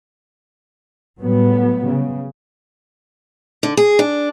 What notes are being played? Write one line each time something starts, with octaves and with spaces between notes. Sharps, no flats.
A2 F#3 G3 B3
C#3
D3
G#4
D4